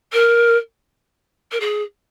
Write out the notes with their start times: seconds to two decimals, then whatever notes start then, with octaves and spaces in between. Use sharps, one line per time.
0.13 A#4
1.51 A#4
1.60 G#4